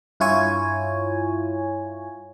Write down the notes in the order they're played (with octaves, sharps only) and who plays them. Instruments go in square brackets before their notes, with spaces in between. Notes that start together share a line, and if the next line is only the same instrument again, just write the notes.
[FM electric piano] G2 E4 F4 C#5 G#5